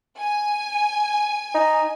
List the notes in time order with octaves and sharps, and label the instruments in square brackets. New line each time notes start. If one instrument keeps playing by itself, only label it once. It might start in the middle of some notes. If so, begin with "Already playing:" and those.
[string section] G#5
[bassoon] D#4